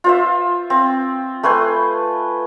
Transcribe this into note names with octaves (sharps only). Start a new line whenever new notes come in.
F4 C5 E5
C4
A3 B4 C5 G#5